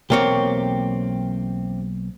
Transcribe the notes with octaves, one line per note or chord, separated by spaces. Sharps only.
B1 E2 A#3 C4 G4 C#5